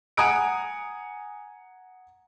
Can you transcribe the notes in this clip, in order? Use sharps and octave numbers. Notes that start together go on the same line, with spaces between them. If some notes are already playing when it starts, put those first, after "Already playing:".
F#5 G#5 A#5 D#6 D7